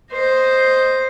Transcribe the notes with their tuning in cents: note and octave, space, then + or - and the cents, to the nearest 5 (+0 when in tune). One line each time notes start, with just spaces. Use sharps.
C5 +0 D#5 +0